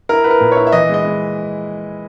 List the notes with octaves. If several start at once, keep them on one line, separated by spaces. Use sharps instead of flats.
E4 A#4
E4 B4
A#4
A#2
E4 C#5
E5
E3 D#5
G#3 D#5
G#3